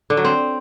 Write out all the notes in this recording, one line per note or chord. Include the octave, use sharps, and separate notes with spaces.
D3
F#3
C4